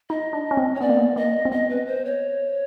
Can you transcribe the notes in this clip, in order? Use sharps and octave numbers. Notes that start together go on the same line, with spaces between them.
D#4 D#5
D4
C#4
C4
C#5
B3 D5
A#3
B3
A#3 D#5
C4
B3 D#5
B4
C5
C#5